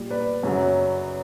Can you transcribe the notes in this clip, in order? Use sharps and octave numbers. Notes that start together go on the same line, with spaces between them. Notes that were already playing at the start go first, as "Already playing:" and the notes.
Already playing: A#2 G3
B4 D5
F#2 C#3 F#3